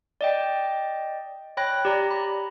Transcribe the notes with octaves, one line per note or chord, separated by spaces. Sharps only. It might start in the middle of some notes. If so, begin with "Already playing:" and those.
D5 D#5 G5
C#5 G5 B5 F#6 A#6
G4 D5 A#5
B5